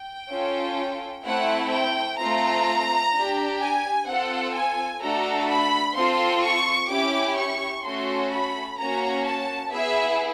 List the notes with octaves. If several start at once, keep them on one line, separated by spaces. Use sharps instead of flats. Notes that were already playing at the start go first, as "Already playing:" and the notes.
Already playing: G5
C#4 F4 A4
A3 C4 E4 F#5
G5
A3 C4 F4 A#5
D4 G4
G#5
C4 F4 A4 F#5
G#5
A3 D4 F#4 A4 A#5
B5
C4 F4 A4 C6
C#6
C#4 E4 G4 D6
C#6
A3 C#4 F#4 A4 C6
B5
A#3 C#4 F#4 A#5
A5
B3 E4 G#4 E5